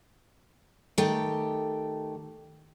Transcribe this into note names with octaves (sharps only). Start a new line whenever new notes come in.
D#3 A3 G4 G5